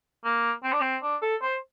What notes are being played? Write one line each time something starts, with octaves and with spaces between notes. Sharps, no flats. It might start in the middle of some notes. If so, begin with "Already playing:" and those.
A#3
C4
D4
C4
D4
A4
C5